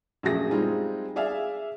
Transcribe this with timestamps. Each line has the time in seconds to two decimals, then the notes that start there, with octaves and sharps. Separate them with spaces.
0.23 A#1 F#2 A3 G4 G#4 A#6
0.51 G3 G#3 C4 D#4 F4 G#4
1.16 G#4 D5 E5 F5 G#5